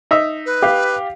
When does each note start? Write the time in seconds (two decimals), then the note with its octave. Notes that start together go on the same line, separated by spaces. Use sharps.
0.11 D#4 E5
0.46 B4
0.62 G4 F5